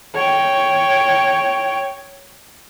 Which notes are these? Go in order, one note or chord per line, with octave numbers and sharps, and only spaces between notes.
C#5 G5